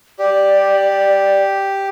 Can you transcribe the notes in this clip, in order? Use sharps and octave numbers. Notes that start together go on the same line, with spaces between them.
G4 D5